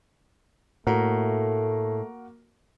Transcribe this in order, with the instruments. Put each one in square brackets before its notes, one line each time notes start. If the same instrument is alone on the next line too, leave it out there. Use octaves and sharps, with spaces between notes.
[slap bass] A2 [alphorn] A3 [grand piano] A#3 F#4 A#4